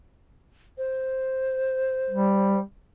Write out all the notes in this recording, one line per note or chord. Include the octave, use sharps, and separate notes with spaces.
C5
G3